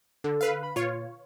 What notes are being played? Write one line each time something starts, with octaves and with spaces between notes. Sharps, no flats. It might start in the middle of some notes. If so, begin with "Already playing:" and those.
D3 A4
B4 F5
B5
A#2 F4 C#5